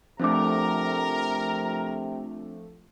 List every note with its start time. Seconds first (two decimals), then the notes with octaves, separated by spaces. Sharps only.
0.20 C3 F3 A3 C4 D4 A#4 A#5 D6